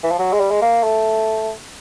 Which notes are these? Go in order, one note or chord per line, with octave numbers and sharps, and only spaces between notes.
E3
F3
F#3
G#3
G3
G#3
A#3
A3